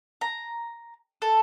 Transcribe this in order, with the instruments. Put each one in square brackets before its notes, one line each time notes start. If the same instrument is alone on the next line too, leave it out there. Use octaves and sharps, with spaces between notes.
[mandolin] A#5
A4